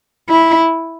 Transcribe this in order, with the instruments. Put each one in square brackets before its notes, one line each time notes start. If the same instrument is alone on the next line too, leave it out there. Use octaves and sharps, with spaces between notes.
[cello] E4